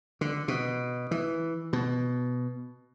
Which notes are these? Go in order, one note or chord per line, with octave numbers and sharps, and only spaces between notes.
D3
B2
E3
B2